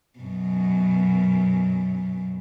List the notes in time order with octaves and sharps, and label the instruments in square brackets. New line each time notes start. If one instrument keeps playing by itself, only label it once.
[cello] F#2 B2